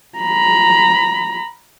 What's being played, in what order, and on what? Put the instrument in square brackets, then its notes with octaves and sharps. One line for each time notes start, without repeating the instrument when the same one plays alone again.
[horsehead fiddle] A#5 B5